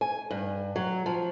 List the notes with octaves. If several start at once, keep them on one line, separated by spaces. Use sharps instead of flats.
G#5
G2
F#3
F3